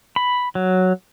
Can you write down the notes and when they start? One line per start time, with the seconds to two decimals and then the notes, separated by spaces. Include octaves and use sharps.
0.16 B5
0.55 F#3